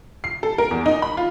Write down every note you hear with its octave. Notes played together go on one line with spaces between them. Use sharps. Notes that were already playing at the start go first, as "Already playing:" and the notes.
C7
A4
A#4
E2
D#4
B5
F4